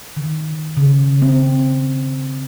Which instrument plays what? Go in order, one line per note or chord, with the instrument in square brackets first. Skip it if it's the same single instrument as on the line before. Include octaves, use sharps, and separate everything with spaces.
[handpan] D#3
C#3
C4